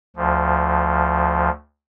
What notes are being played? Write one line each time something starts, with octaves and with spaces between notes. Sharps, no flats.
D2 F3